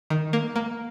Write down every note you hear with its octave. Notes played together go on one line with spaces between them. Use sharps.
D#3
A#3
A#3